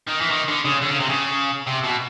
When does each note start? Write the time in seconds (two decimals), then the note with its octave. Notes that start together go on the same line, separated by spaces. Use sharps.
0.08 D#3
0.22 E3
0.31 D#3
0.48 D3
0.65 C#3
0.82 D3
0.91 C#3
1.00 C3
1.09 C#3
1.67 C3
1.83 B2